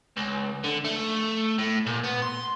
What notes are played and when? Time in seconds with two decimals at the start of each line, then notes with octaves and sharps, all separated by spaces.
0.17 C#2
0.64 D3
0.85 A3
1.59 A2
1.86 A#2
2.04 B3
2.22 C6